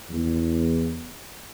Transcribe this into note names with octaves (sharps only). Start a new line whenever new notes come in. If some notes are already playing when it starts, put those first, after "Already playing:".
E2